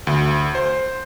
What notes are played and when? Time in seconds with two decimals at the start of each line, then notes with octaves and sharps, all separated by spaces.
0.07 D2
0.55 C5